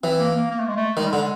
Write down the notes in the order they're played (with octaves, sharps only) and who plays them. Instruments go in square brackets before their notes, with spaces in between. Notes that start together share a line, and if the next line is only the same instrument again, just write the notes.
[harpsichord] E3 [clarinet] C4
[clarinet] A#3
A#3
A#3
A3
G#3
A3
[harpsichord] D#3 [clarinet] G#3
[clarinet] G3
[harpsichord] D3 [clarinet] G#3